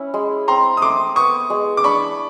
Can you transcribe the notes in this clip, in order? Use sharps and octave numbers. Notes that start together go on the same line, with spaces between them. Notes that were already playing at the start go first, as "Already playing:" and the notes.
Already playing: C#4 E4
G#3
C4 A#5 C6
D#6
A3 C6 D6
B3 C#6 D#6
G#3
D6
D4 B5 C#6